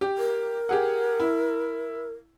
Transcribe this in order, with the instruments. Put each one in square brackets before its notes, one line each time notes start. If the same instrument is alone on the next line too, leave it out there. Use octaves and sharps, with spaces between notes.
[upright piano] G4
[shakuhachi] A#4
[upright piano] G4 G#4 F#5
E4